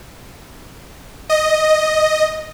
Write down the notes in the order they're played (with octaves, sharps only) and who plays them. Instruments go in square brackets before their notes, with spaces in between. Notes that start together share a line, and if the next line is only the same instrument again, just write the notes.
[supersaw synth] D#5